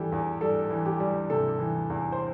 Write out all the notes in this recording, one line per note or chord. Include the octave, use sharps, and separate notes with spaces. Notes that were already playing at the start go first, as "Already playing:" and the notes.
Already playing: E3 G3 G4 A4
E2
G3 A4
E3
G4
G3
C3 A4
E3
E2
C5